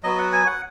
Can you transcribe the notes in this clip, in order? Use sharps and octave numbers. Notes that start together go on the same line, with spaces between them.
F#3 B3 F#4 D#5
F#5
G#5
F#5